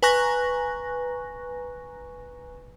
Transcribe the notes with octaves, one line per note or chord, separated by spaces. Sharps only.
B4 G#5 A#5 C#6 F#6 A#6